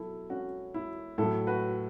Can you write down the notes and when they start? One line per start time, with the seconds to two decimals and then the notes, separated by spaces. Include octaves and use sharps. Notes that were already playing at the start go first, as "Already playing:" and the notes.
Already playing: B2 F#3 E4 A4
0.30 C#4 F#4
0.74 E4
1.18 A2 E4 A4
1.22 F#3
1.47 F#4 B4